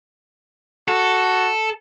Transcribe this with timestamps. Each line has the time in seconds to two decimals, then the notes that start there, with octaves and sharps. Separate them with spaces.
0.88 F#4 A4